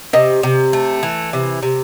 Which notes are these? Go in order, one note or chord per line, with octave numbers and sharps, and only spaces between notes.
C3 D#5
C3
A3
E3
C3
C3